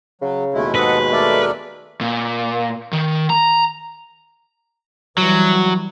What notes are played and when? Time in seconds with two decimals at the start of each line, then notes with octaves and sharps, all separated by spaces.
0.21 C#3 F#3
0.54 D#2 B2 G#3 A3 E4
0.75 G#2 A4 B4 D#5 F#5
1.12 A3 A4 A#4 D5
2.01 A#2
2.93 D#3
3.30 A#5
5.18 E3 F#3 G3